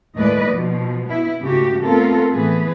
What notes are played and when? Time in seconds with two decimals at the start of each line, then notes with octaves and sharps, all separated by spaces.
0.17 D#2 A2 G#3 B4 D5 D#5
0.51 B2 F3
1.09 B3 E4
1.40 G#2 C#3 A3 F#4 G4
1.83 A3 B3 C4 F4 A4 A#4
2.31 A2 E3 B3 G#4 B4